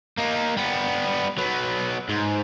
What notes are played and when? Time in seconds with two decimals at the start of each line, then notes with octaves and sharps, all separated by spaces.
0.18 A#3 D#4
0.57 G3 B3
1.38 F#3 B3
2.09 G#2